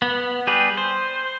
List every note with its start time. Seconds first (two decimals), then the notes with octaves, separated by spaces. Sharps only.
0.02 B3
0.47 G3 G4 G#4 B4
0.77 C5